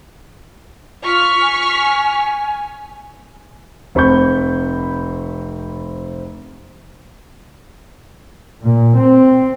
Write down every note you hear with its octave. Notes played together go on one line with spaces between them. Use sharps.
F4 C#6 F6 B6
G#5
F1 C4 B5 C#6 G6
A#2
C4